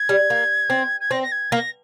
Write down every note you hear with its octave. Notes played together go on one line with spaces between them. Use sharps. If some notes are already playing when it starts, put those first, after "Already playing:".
Already playing: G#6
G3
A#3
C4
G#6
C4 A#6
A#6
G#6
A#3 A#6